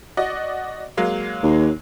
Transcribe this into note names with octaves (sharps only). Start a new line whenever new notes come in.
F#4 D5 D#5
F#3 G#3 A#3
D#2